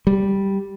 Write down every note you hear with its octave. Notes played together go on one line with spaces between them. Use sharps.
G3